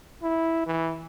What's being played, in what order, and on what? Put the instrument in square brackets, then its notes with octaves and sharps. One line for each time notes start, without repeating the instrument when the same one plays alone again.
[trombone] E4
E3